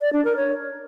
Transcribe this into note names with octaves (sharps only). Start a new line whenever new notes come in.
D5
D4
A#4
C#5